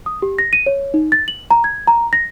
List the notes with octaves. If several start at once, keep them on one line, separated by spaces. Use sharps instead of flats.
D#6
G4
A#6
D#7
C#5
D#4
A6
F#7
A#5
G#6
A#5
A#6